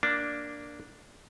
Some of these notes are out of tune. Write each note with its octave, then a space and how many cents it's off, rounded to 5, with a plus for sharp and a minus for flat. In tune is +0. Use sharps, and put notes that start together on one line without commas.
A#3 +0 D4 +0